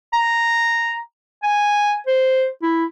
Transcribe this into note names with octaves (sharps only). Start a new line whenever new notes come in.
A#5
G#5
C5
E4